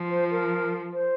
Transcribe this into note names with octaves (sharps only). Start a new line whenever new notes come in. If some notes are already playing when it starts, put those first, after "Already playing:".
Already playing: F3
C5
A#4
C5